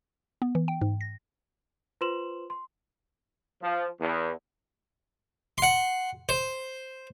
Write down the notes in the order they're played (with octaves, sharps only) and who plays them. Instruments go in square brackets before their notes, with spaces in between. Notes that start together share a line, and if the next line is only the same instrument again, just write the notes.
[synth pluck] B3
E3
G5
G#2
A#6
[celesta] F4 B4 C5 C6 E7 F#7
C6
[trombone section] F3
E2
[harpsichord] F#5 C6
C5